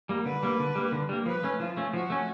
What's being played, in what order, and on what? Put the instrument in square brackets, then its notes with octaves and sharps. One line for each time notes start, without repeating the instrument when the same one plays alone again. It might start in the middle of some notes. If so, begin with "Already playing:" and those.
[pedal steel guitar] G3 A#3
[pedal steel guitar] D3 [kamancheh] B4
[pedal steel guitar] G3 A#3
D3
G3 A#3
D3
G3 A#3
[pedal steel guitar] F3 [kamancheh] B4
[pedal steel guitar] A3 C#4
[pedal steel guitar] F3 [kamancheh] F4
[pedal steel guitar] A3 C#4
[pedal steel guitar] F3 [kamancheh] F#4
[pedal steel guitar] A3 C#4